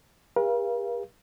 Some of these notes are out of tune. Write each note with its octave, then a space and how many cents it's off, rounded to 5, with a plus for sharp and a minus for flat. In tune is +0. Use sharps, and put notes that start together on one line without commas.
G4 +45 A#4 +45 F5 -25